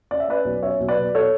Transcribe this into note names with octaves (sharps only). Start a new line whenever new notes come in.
C#4 D5
E5
C#4 B4 D5
B1
C#4 C#5 E5
B1
B4 D5
B2
A4 C#5